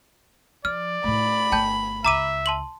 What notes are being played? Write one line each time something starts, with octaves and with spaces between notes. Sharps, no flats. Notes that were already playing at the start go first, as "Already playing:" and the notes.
F3 D5 F6
A2 A3 B5
G1 A3 G5 A5 G6
C#2 E5 A#5 D6 D#7
A5 C6 F#7